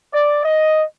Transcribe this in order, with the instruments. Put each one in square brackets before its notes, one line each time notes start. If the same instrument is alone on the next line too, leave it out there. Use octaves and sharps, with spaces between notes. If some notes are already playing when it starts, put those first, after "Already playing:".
[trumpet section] D5
D#5